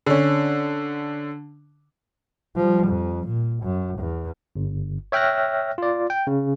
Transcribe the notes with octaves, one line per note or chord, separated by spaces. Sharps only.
D3 C#4
F3 G3
F2
A#2
F#2
E2
G1
C#5 E5 G5 F6 F#6 A#6
F4 D5
G5
C#3